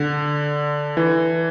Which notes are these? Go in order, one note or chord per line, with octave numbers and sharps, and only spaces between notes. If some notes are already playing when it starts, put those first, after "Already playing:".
Already playing: D3
E3